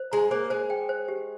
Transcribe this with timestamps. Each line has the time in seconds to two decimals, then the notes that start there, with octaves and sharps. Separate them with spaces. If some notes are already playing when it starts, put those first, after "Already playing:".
Already playing: C5
0.12 G#3 A#5
0.31 A#3 C5
0.50 G#3 C5
0.70 G5
0.89 C5
1.08 G4